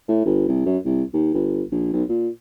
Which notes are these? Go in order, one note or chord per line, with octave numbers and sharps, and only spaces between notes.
A2
G1
C2
F#2
C2
D#2
G1
A#1
B1
A#2